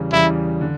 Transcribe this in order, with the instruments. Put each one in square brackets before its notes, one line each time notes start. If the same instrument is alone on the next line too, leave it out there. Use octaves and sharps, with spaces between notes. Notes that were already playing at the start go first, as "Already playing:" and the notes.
Already playing: [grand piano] E2 C#3 E3 G3
[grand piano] E2 C#3 E3 G3 [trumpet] E4
[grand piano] D3